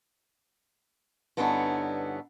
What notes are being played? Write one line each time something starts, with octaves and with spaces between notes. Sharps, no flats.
G2 D3 B3 C#4 D#4 E4